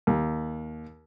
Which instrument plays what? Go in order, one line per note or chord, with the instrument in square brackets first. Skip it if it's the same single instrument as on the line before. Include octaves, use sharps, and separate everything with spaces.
[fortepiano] D#2